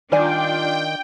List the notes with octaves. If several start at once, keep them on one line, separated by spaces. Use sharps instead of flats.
D#3 G3 D4 F4 D5 G5 G#5